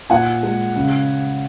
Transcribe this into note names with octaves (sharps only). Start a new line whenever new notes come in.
A#2 F#5 G#5
G#3
C#3